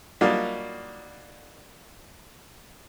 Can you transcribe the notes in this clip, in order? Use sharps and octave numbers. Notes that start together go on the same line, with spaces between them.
F#3 G3 A#3 D4 D#4 F4